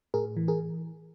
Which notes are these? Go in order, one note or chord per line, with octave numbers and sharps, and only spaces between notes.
A2 G#4 A#4
E3
G#4 A#4